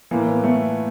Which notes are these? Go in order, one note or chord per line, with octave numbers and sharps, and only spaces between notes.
A2 E3 A#3
B3
A3